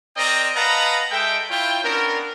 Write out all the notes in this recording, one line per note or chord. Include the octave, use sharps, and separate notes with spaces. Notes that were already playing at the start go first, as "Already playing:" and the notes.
C4 A#4 D5 D#5 G5 A#5
B4 D#5 F5 F#5 A5 A#5
G#3 A4 E5 G5
E4 F4 C#5 G5
B3 C#4 D4 A#4